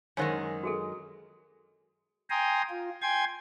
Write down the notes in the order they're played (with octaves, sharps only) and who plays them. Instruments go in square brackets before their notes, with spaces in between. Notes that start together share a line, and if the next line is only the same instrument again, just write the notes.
[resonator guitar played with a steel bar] F#2 D#3 G#3 [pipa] C#4 C5 F#5
[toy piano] F#4 G#4 A4
[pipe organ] G5 G#5 A#5 C6 D#6
F4
G5 G#5 C6 G#6